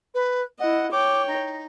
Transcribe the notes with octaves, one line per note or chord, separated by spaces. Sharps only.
B4
E4 D#5 F#5
C#5 G5 D6
D#4